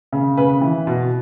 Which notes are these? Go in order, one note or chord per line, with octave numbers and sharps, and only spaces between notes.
C#3
C#3 B4
E3
B2